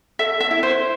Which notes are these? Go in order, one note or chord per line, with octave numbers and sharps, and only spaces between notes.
A4 E5
E5
E4
C5